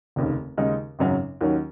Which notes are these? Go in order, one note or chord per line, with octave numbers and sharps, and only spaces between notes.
F1 D#2 C#3
D#2 C#3 G#3 D#4
G#1 F#2 C#3 F#3 C#4
D#2 D#3 F#3 C#4